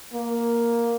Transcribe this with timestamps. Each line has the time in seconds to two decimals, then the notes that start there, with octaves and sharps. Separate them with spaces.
0.13 A#3